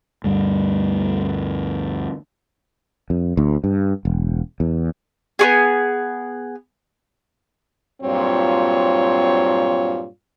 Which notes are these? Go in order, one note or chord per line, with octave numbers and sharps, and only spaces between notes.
D2 G2 G3
F2
D2
G2
E1
E2
B3 F#4 G#4
G2 A#2 F#3 C4 F4 C#5